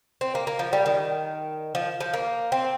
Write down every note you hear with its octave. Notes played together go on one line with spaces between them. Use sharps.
C4
A#3
A#3
F3
G3
D#3
F3
F3
A#3
C4